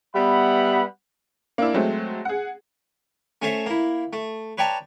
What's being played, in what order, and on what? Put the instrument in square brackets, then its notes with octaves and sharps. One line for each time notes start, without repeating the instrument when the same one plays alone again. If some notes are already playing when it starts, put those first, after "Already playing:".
[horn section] G3 B3 E5 F#5 B5
[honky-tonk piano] A#3 D4 E4
F#3 G#3 A3 C4
G#4 F#5
[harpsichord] A3 C#4 A4 C5 C#5 E5
A#3 E4
A3
B4 C#5 D5 G5 A5 A#5